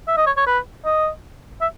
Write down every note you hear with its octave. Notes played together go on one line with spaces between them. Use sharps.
E5
D#5
C#5
C#5
B4
D#5
E5